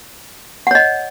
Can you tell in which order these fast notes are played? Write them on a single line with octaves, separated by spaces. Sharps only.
F#5 C#5 D#5